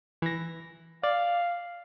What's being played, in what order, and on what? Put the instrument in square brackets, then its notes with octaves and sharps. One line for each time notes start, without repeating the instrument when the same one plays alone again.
[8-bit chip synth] E3 A#6
[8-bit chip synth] D5 [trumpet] F5